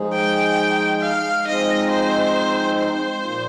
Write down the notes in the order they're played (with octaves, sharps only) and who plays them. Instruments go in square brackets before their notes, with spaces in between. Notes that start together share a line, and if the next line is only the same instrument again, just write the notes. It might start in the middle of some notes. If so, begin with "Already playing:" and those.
Already playing: [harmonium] F3 G#3 D#4 G#4
[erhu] G5
F5
[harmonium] F3 G#3 C4 D#4 [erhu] D#5
[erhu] C5
C5
[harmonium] A#2 F3 A#3 F4